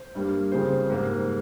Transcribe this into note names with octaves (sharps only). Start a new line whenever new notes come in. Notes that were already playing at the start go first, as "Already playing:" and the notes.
Already playing: C5
G2 G3 A#3
F2 C#3 G3 C5
G#2 G3 A#3